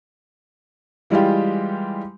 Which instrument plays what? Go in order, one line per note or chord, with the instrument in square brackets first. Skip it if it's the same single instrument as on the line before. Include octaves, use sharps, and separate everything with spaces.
[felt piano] E3 G3 G#3 F4 G4